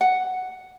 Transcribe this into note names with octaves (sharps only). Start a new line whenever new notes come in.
F#5